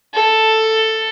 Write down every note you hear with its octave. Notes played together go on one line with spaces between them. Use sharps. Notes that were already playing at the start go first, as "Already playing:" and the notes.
A4